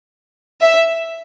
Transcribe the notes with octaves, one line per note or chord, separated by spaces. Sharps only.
E5